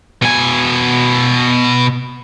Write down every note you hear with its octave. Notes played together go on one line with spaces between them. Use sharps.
B2 G#5